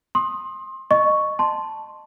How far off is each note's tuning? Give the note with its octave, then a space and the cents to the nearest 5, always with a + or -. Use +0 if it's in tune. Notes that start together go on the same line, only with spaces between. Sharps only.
C6 +25 D#6 +0
D#5 -20 C#6 +0
A5 +0 C6 +0